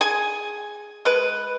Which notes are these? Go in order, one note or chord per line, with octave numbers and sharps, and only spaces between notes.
G#4 G#5
G#3 B4